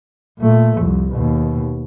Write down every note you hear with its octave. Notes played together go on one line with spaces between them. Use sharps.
A#2 A3
C2 F2
D#2 B2